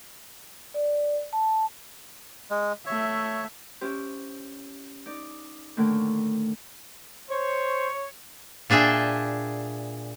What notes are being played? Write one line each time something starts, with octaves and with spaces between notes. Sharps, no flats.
D5
A5
G#3
A3 C#5 E5
C#4 E4 G4 C5
D#4 D5
A2 D3 D#3 A3 A#3
C5 C#5
A#2 D4 G#4 E5 G5